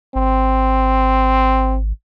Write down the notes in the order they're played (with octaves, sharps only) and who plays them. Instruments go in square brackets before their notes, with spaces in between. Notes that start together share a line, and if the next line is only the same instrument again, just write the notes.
[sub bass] G#1 [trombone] C4